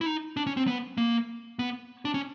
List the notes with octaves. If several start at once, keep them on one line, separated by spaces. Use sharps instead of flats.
E4
D#4
D4
C#4
C4
B3
A#3
B3
D4
C#4